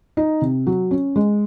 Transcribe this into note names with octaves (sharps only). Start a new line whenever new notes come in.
D#4
C3
F#3
C#4
G#3